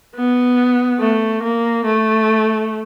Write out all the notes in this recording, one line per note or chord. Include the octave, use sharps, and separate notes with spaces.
B3
A3
A#3
A3